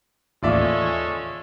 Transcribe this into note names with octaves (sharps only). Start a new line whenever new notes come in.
A1 D#2 G#3 C#4 F4 A4 D5 E5